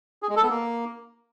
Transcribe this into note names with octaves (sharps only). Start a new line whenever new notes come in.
G#4
G#3
A4
B3
A#3